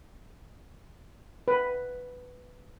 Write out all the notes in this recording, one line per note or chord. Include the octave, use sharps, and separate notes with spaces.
B4